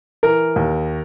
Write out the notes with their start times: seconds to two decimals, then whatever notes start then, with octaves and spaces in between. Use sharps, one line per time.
0.23 E3 A#4
0.56 D#2